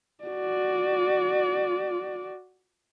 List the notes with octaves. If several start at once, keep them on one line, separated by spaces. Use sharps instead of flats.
F#4 D5